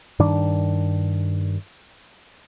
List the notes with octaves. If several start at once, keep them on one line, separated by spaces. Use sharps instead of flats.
G2 D#3 D4